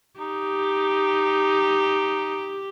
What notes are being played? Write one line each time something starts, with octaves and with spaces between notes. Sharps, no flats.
D#4 G4